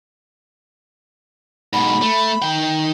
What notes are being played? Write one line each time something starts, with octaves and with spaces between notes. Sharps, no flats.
G#2 B2 B5
A3
D#3 G5